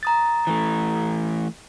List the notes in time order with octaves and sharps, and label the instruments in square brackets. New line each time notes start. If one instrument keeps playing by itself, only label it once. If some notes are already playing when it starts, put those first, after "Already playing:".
[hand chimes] A#5 D#6 A6
[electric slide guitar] E3 A3